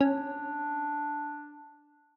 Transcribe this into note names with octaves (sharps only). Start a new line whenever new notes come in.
C#4 D4